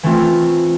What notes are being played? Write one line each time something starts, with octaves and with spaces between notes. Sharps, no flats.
E3 A3 C4 F4